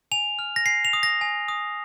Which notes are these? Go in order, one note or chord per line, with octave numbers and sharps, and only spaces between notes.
G#5 F7
F6
A#6
G#5 C7
F7
D#6
A#6
G#5
D#6